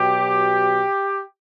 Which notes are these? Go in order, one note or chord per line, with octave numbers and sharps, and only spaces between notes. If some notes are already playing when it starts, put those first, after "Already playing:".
Already playing: B2 F#3 G4